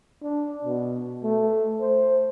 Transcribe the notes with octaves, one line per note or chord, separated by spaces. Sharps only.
D4
B2
A3
C5